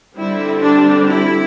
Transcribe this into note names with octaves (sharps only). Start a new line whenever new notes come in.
D3 G3 C4 E4
D4
E4